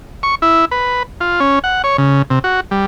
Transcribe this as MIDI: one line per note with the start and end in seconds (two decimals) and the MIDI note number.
0.23 0.35 85
0.42 0.65 64
0.71 1.03 71
1.21 1.40 65
1.40 1.59 61
1.64 1.82 78
1.84 1.97 73
1.98 2.22 49
2.30 2.39 48
2.44 2.60 66
2.71 2.86 55